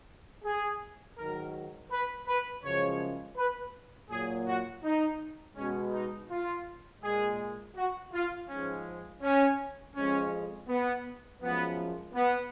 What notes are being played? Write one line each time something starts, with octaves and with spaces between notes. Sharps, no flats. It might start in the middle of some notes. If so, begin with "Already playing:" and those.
G#4
G#2 D#3 F#3 A#4
B4
B4
F#2 C#3 F3 G#3 C#5
B4
A#2 F#3 G#4
F#4
D#4
B2 G#3 C#4
D#4
F4
A#2 G#3 G#4
F#4
F4
G#2 F3 G#3 C#4
C#4
F2 F3 G#3 C#4
B3
F#2 F3 G#3 B3
B3